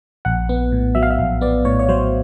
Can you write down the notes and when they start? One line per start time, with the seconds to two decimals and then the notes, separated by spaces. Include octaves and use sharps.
0.25 A#1 F#5
0.49 B3
0.72 A2
0.95 F#3 E5
1.03 F5
1.11 E5
1.19 A#1
1.41 B3 D5
1.65 A2 C#5
1.79 C#5
1.89 F#3 C5